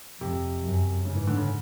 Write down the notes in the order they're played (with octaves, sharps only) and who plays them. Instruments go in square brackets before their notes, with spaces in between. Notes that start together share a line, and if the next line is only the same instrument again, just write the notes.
[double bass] F2 [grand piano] C3
[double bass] F#2
[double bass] G#2 [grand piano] C#3
[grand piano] E3
D3
C#3